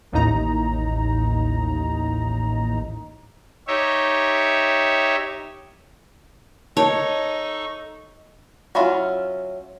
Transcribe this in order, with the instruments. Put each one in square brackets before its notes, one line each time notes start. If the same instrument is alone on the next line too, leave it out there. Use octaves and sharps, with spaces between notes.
[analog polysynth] A1 D#2 A2 D#4 A#5
[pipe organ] D#4 G4 C#5 E5
[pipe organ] D#4 A4 C#6 [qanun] C#5 [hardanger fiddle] D#5 [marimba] A5
[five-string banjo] F#3 C#4 E4 F4